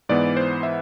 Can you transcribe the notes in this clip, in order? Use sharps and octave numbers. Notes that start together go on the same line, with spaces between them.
G#2 E3 B3 D5
C5
E5